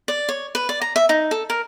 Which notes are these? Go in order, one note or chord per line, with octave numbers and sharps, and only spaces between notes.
D5
C#5
B4
D5
A#5
E5
D#4
A4
A#4